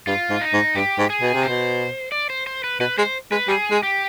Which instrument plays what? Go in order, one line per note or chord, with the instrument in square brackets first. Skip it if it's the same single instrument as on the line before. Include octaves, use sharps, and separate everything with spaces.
[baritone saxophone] G2 [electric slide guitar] F4
[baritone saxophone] G#2
[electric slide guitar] D#4
[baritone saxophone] G#2
[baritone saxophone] G2 [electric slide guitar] G4
[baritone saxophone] G#2
[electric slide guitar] G#4
[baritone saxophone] B2
C3
[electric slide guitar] C5
[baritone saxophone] B2
[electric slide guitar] D5
C5
C5
B4
[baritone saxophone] B2 [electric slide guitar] B4
[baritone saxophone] G#3 [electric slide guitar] C5
[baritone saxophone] G#3 [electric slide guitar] B4
[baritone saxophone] G3 [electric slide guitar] G#4
[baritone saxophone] G#3
[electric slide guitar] G4